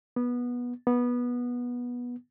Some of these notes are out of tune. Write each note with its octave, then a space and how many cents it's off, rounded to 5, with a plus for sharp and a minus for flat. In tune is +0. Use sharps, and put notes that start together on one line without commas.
B3 -15
B3 -15